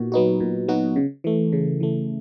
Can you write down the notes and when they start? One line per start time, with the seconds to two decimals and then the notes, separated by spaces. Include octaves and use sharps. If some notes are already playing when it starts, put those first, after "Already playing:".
Already playing: A#2 B3 D#4 F#4
0.12 F#3 B3 D#4 F#4
0.40 A#2
0.68 F#3 B3 D#4 F#4
0.96 C#3
1.24 E3 A3
1.52 C#3
1.80 E3 A3